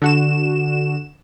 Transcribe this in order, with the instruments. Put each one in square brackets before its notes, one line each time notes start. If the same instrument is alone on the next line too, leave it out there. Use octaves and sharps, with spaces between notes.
[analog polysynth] D3 F#4 E7